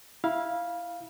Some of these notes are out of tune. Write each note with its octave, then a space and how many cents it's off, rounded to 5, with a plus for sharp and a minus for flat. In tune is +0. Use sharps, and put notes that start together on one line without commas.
E4 +0 F5 +0 B5 -30